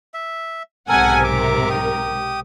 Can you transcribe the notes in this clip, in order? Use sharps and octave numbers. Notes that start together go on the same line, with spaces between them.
E5
B1 G#2 C3 A4 A#4 F#5 G#5
A#4 E5 D6
G4 D#6